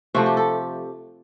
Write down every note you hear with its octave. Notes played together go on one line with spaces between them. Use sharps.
C3 F3 A3 F#4
G4
A4